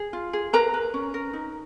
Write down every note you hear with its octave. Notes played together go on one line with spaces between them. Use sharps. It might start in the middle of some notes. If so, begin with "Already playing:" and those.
Already playing: G#4
F4
G#4
A#4 B4 A#5
B4
C#4
A#4
D#4